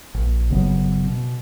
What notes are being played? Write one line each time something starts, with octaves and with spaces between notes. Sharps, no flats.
A#1
G1 C#3 F#3 B3
B2